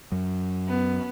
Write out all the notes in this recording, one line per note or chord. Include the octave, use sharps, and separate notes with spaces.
F#2 F#3
B3